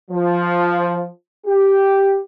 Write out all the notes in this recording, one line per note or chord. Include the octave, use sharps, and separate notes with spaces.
F3
G4